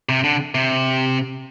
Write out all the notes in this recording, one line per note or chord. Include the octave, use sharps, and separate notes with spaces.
C3
D3
C3